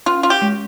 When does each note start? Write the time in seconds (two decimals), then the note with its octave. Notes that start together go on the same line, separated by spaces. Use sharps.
0.06 C#4 F4
0.23 F4
0.30 G4
0.42 G#3